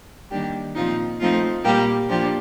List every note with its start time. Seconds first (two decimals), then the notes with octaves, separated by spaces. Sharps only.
0.31 D#3 G3 A#3 D4 G4
0.75 A#2 F3 C4 D#4 F4
1.20 F3 A3 C4 D#4 F4
1.64 A#2 G3 A#3 G4
2.09 F3 A#3 D4 G4